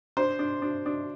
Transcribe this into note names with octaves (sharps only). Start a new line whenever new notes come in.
D4 C5
D4
D4
D4